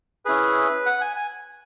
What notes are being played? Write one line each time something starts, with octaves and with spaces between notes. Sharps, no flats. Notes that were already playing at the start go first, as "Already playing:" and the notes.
C#4 E4 G#4 B4
F#5
G#5
G#5